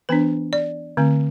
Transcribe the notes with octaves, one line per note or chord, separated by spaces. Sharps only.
E3 B3 D4 B4
D5
D3 A3 C4